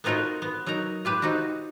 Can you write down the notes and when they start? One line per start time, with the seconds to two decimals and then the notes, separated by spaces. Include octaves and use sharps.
0.04 B3 C4 D#4 F4 F#4 A#4
0.42 B3
0.66 F#3 D#4 A#4 A#5
1.05 F4 G4 B4
1.22 C4 D#4 F4 F#4